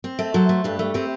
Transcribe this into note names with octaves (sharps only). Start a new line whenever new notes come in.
C4
A3
F#3 A4 C5
A3
G2 G4 B4
A3
C4 G4 B4